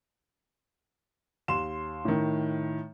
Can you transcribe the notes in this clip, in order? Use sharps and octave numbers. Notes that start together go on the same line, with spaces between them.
D#2 C6 E7
A2 D#3